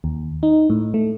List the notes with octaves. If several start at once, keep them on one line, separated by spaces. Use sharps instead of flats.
D#2
D#4
A2
A3